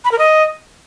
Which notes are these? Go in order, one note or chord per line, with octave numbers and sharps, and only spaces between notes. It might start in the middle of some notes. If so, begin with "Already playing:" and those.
B5
A#4
D#5